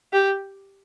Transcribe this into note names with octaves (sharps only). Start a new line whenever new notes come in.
G4